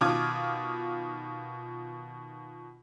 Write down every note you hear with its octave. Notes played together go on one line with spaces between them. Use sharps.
B2 D#3 F4 D6 D#6 G#6